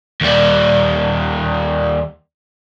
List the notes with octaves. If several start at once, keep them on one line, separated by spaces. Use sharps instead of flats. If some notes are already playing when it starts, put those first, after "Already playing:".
D#2 G3